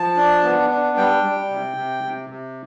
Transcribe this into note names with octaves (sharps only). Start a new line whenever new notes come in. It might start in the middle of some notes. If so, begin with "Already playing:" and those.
Already playing: F3 A5
D4
B3
D4
G3 G5
G3
C3
C3
C3
C3